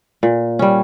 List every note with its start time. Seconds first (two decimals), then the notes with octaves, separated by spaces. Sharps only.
0.23 A#2
0.59 G3 C#4